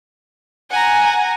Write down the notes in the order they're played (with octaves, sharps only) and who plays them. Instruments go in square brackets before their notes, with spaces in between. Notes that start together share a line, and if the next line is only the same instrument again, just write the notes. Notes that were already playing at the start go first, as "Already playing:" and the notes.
[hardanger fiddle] F#5 [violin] G#5 A#5